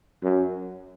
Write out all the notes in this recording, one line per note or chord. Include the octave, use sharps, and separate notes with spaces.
F#2